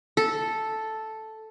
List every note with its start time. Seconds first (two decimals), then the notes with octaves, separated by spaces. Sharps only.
0.17 A4